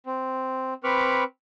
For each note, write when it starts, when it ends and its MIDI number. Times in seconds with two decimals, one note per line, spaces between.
0.06 0.74 60
0.84 1.24 60
0.84 1.24 71
0.84 1.24 83
0.84 1.24 85
0.84 1.24 86
0.84 1.24 89